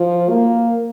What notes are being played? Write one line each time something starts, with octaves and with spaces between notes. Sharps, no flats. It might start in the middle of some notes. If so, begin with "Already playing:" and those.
Already playing: F3
A#3